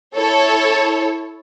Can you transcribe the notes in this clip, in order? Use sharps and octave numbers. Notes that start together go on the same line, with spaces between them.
E4 A4 C#5